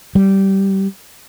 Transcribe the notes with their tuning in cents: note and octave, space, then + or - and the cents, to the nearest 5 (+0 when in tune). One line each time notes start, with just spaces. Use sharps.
G3 -15